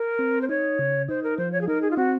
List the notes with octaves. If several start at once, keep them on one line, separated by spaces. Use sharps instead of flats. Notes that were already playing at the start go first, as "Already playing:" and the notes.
Already playing: A#4
C4
C5
D#4 C#5
C#3
D#4 C5
A#4
F3 C5
C#5
G#4
D#4 A#4
G#4
F4
C4 F#4